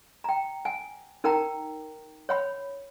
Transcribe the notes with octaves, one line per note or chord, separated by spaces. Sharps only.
G5 A#5
F#5 G#5
D#4 A#4 F#5 G5 A#5
C#5 F#5 B5